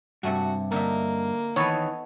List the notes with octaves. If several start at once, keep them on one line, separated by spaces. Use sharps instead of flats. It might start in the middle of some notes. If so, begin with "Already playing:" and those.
G2 C3 A3 F#4 G#5
D3 A#3 D#4 E5
D#3 E3 B3 A4 C#5 D#5